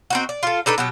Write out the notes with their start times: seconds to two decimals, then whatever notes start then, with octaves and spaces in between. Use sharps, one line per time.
0.10 C4 D#4 F#4
0.29 D5
0.43 F4 A4
0.66 D4 D#4 A4 B4
0.78 B2 F#3 G4